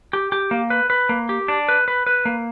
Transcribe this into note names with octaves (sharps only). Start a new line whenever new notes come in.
G4
G4
A#3
B4
B4
A#3
G4
D4
B4
B4
B4
A#3